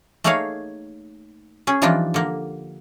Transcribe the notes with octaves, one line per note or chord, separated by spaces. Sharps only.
A3 A#3 D#4 G#4 C#5 F5
C#4 G#4
E3 F3 G3 D4 D#4 F4
D3 A#3